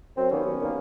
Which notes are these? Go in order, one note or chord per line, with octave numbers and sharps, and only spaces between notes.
F#2 C4
D#3 G3 A#3 B3 C#4
F#2
D#3 G3 A#3